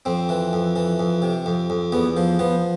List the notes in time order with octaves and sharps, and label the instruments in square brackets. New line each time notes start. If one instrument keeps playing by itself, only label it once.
[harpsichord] F2 C4
E3
F2
E3
F2
C3
F2
F2
E2 B3
F3
F3 B3